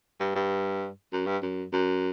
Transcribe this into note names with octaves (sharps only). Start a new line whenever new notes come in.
G2
G2
F#2
G2
F#2
F#2